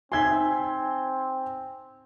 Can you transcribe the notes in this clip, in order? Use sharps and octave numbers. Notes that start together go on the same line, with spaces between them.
C4 D#4 E5 G#5 C6 G#6